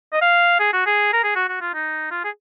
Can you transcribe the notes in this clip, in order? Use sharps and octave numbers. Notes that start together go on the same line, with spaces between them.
D#5
F5
G#4
F#4
G#4
A#4
G#4
F#4
F#4
F4
D#4
F4
G#4